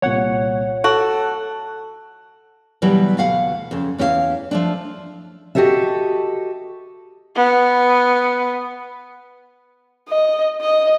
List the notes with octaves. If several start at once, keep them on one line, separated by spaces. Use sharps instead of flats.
C2 A#2 C#5 F#5
F#4 A4 D7
B2 E3 F#3 G3
D2 B2 F5 F#5
F2 C#3
E2 C#4 E4 G#4 F5
F3 A3 D4
F#4 G4 A4 D#5 E5
B3
D#5
D#5